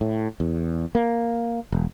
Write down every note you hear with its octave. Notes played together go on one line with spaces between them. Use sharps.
A2
E2
A#3
E1